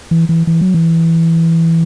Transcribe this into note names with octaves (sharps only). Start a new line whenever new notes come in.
E3
E3
E3
F#3
E3